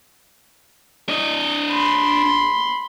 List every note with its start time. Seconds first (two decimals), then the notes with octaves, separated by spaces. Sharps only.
1.09 D4 D#5
1.71 B5 C6